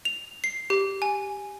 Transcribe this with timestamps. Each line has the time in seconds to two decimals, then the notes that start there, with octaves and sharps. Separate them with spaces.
0.05 F7
0.44 C7
0.70 G4
1.02 G#5